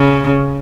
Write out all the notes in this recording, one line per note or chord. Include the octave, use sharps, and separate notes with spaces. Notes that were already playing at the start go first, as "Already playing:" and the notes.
Already playing: C#3